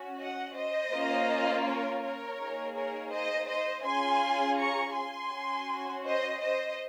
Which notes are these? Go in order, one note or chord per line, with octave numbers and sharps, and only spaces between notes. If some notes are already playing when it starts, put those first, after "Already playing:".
Already playing: C#4 F#4
D#5 F#5
C5 D#5
A#3 C#4 F4
A#4 C#5
A#4 C#5
A#3 D#4 G#4
A#4 C#5
C5 D#5
C5 D#5
C#4 F4 G#4 G#5 C6
A#5 C#6
G#5 C6
C#4 F#4
C5 D#5
C5 D#5